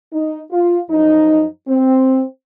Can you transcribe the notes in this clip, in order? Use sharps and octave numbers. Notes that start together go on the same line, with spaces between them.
D#4
F4
F#2 F3 D#4
C4